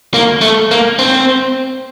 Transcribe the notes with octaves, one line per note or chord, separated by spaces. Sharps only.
A#3
A3
A#3
C4